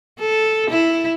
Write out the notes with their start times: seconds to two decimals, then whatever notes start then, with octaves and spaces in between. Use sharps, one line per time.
0.19 A4
0.70 E4